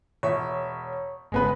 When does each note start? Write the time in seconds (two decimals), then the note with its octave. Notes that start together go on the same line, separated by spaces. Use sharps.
0.23 E1 C#5 E5
1.32 G1 C#3 G#3 B3 B4